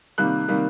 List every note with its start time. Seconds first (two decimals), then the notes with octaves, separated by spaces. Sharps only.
0.18 C3 D#3 G3 A#3 F#6
0.48 C3 D#3 G3 A#3